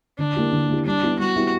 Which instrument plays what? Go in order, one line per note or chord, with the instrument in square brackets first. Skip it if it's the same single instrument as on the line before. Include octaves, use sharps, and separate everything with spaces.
[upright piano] D3 [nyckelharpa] D4
[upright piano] A#3 E4 G4
D3
A#3 E4 G4
[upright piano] G3 [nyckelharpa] D4
[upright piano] B3 E4 G4
[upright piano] G3 [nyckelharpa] F#4
[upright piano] B3 E4 G4